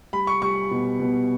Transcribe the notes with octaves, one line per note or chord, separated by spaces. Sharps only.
G3 B5
C#6
G3 C#6
B2
B2